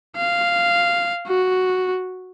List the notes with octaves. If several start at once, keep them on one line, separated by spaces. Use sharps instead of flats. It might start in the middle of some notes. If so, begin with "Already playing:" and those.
F5
F#4